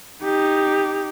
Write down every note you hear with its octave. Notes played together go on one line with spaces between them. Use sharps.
D#4 G4